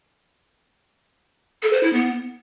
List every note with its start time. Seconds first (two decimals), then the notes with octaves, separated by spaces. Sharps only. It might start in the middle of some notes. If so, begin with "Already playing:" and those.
1.63 A4
1.73 C5
1.83 E4
1.93 B3